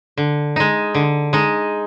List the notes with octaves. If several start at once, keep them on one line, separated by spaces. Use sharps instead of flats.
D3
G#3 D#4
D3
G#3 D#4